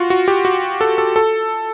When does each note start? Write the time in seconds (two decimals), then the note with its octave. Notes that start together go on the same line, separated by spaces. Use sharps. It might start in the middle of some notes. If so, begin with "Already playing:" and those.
Already playing: F4 F#4
0.10 F#4
0.28 G4
0.45 F#4
0.81 A4
0.98 A4
1.16 A4